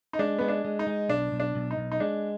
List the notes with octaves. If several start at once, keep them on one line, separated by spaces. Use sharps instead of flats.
D#4
G#3 D4
G#3 B3
D4
G#3
D#4
G#3
B1 D4
B1
D4
B1
D#4
B1
D#4
G#3 D4